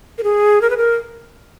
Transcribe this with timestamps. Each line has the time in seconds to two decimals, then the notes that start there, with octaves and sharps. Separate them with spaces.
0.18 A#4
0.23 G#4
0.61 A#4
0.70 B4
0.77 A#4